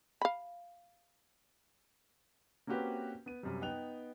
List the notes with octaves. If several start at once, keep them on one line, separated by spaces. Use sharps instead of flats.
F5 B5
A#3 C4 C#4 F#4 G4 B4
B3 D#7
F#2 C3 G3
B3 D#4 G5 F#6 F7